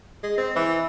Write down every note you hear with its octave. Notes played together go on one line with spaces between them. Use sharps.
G#3
C4
E3